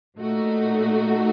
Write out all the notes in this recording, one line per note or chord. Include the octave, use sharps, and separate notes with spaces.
A#2 A3 D#4 F#4